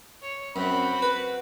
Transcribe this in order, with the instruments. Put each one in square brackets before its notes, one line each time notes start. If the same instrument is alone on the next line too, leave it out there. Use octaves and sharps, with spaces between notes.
[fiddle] C#5
[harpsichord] F#2 [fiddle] C4 F#4 [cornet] B5
[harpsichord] B4